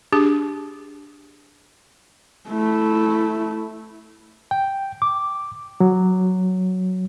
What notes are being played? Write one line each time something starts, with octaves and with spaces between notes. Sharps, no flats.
D4 G4 G#4
A3 E4
G5
D6
F#3